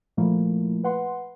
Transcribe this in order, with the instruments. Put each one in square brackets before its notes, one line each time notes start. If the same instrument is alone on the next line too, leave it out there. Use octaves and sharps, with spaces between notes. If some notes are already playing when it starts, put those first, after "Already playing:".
[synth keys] A#2 F3 A3 A#3 E4
B4 F#5 C6